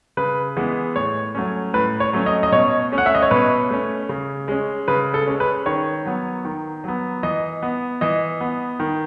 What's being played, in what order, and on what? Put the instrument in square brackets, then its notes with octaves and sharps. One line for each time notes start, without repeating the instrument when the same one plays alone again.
[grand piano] C#3 B4
E3 G#3 B3
A2 C#5
F#3 A3 C#4
A2 B4
C#5
F#3 A3 C#4
D#5
D#5
B2 C#5
A3 C#4
F#5
E5
D#5
C#5
B2 B4
A3 C#4
C#3
G#3 C#4
C#3 B4
A4
G#3 C#4
B4
D#3 C#5
F#3 B3
D#3
F#3 B3
E3 D#5
B3
E3 D#5
B3
D#3